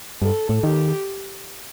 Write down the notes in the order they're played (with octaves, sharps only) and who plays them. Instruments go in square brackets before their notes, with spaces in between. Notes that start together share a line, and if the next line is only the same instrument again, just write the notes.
[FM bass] G2 [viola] A4
[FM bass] A2
[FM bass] D#3 [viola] G4